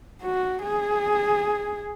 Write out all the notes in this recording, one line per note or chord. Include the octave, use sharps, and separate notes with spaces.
F#4
G#4